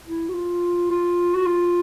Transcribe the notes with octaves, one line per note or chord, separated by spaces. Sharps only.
E4
F#4
F4
F4
F#4
F4